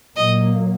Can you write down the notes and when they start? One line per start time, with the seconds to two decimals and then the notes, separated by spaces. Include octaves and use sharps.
0.16 A#2 F#3 A#3 D#5